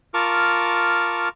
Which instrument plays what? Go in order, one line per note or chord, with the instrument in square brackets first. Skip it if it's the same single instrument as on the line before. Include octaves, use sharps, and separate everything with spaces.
[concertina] F4 A#4 A5 C#6 D6 F6